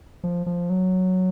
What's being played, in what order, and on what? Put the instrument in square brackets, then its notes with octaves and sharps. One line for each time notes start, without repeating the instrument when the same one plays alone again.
[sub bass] F3
F3
F#3